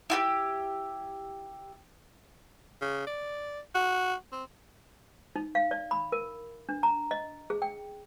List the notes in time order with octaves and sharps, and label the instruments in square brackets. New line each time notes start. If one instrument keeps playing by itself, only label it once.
[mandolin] E4 F#4 G4
[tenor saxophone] C#3
D5
F#4
C4
[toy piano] D#4
F5
D5
B5
A#4
D4
A#5
D#5
G#4
G5